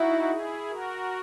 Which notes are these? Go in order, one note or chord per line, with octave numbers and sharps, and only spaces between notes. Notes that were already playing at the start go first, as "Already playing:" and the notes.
Already playing: D#4 E4 F#4
E4 G#4
F#4 A#4